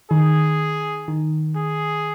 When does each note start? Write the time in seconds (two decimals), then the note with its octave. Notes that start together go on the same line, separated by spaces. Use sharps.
0.11 D#3 G#4
1.08 D#3
1.56 G#4